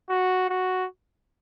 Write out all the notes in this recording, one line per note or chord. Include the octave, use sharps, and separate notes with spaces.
F#4
F#4